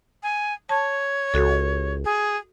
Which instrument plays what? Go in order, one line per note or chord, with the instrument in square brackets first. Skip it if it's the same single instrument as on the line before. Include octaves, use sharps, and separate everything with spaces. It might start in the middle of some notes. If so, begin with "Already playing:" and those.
[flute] G#5
[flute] C#5 [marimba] A5
[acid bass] C#2 [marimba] F#4 A4
[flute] G#4